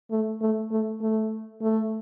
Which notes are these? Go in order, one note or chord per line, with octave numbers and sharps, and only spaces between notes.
A3
A3
A3
A3
A3